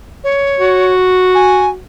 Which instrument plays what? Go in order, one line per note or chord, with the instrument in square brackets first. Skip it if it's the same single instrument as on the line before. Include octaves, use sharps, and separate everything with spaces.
[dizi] C#5
[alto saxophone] F#4
[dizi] G#5